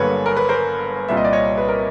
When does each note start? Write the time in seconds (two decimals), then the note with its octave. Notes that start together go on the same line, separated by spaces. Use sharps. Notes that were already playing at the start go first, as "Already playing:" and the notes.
Already playing: G1 G2 D3 F#3 A#3 B4 C#5
0.26 A#4
0.37 B4
0.49 A#4 C5
1.08 C2 A#2 G3 E5
1.17 D#5
1.25 D5
1.33 C#5 D#5
1.58 B4
1.68 A#4